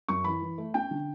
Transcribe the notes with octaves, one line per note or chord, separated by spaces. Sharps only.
F#2 C#6
E3 B5
E3
A3
C#4 G5
D3